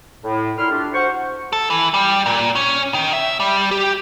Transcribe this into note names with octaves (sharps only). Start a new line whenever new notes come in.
A2
A#2 E4 C6 F6
A3 D4 F4 G4
F#4 C5 C#6
A4
E3
G3
A#2
C#4
D#3
E5
G3
G4